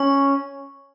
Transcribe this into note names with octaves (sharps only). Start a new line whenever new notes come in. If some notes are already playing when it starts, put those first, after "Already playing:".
Already playing: C#4 C#6